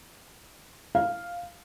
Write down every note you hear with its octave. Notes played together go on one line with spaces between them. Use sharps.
F5